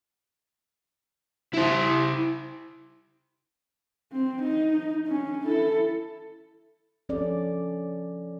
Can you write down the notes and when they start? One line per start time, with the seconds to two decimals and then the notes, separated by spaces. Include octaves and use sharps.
1.54 E4 C5
4.12 C4
4.42 D#4
5.07 C#4 D4
5.46 E4 A4
7.09 F3 C#4 A4 D5